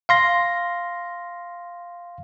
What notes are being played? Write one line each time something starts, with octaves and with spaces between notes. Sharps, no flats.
F5 C6 A#6